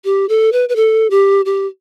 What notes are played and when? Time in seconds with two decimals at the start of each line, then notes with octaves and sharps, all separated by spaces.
0.05 G4
0.29 A4
0.52 B4
0.69 B4
0.76 A4
1.11 G4
1.46 G4